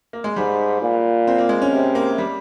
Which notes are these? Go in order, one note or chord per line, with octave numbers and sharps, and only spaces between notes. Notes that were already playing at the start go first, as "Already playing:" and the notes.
A#3
G#3
G#2 G3
A#2
C4
A#3
G#3
C#4
C3
A#3
G3